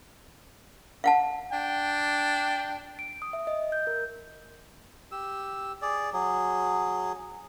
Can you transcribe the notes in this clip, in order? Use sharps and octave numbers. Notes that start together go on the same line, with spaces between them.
F5 F#5 A5
D4 G5
D7
D#6
E5
D#5
G6
A#4
G4 E6
G#4 D5
F#3 G#4